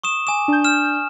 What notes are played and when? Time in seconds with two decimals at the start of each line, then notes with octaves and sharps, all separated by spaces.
0.04 C#6 D#6 E7
0.27 G#5 D6 D#6 E7
0.48 D4 G6
0.64 F6 E7